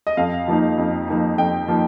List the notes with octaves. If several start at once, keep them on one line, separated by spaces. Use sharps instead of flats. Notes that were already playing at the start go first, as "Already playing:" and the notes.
D#5
F2 F5
F3 A#3 D#4
F2
F3 A#3 D#4
F2 G5
F3 A#3 D#4